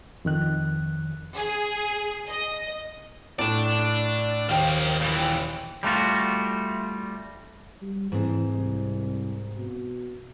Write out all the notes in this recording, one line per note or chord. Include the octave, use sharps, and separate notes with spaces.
F2 D#3 F#6
G#4
D#5
A2 A3 D5 A5
D#2 A#3 C5 G5
A#2 E3
G3 A3 F4 F#4
G3
G#2 E3 C4
C2
B2